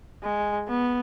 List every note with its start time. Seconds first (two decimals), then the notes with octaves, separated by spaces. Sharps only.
0.23 G#3
0.68 B3